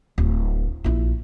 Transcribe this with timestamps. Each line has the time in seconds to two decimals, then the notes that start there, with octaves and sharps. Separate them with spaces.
0.18 D1
0.84 A#1 E4